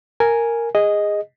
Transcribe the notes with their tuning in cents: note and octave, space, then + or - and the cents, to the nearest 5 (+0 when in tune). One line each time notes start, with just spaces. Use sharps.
A#4 -5 G#5 +0
G#4 -20 D#5 +0